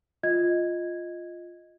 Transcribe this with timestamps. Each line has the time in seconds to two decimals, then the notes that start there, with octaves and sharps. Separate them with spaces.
0.23 F4 D#5 G#6